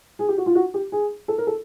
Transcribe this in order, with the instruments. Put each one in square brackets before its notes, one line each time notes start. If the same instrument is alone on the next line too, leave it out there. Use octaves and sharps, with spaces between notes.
[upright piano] G#4
G4
F#4
F4
F#4
G4
G#4
A4
A#4
A4